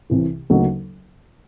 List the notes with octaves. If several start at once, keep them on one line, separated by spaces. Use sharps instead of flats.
C2 C3 E3
D2 C#3 F#3 A#3 D#4